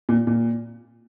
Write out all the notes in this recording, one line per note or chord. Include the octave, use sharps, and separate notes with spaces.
A#2
A#2